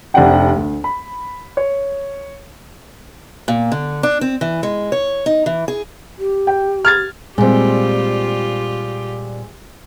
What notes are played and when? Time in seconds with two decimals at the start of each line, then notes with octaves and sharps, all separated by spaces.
0.14 F1 C4 D4 G4 F#5 G5
0.56 D2
0.84 B5
1.57 C#5
3.48 A#2
3.72 D3
4.03 D4
4.21 C4
4.41 E3
4.63 G#3
4.92 C#5
5.26 D#4
5.46 E3
5.68 G#4
6.19 G4
6.47 G5
6.85 F6 G#6 A6
7.38 A#2 G3 G#3 C4 F4 G4